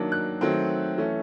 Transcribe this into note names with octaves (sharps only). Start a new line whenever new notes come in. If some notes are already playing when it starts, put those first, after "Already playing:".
Already playing: D#3 F#3 A#3 D4
F#6
D#3 F#3 A3 C4
E3 A3 C#4